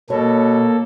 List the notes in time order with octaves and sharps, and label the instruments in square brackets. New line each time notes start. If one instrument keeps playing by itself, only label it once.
[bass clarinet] B2 [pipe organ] A#3 A4 [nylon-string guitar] C#5